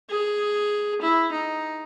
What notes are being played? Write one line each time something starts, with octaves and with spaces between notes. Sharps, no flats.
G#4
E4
D#4